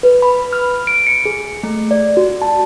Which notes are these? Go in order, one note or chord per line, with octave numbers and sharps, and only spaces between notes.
B4
B5
F6
D7
C#7
G#4
A3
D5
F#4
A5